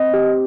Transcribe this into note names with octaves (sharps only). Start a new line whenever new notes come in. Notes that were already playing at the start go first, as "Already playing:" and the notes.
Already playing: C4 D#5
G4